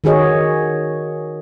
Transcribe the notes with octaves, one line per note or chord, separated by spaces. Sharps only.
D#3 F#4 G#4 C#5 D#5